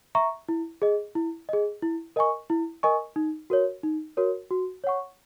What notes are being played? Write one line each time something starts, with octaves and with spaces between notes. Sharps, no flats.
E5 A#5 C#6
E4
G#4 D#5
E4
G#4 D#5
E4
A#4 D#5 G#5 C#6
E4
A#4 D#5 G#5 C#6
D#4
F#4 A#4 C#5
D#4
F#4 A#4 C#5
F#4
C#5 F#5 C#6